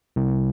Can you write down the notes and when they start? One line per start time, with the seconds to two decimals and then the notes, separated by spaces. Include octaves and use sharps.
0.16 C2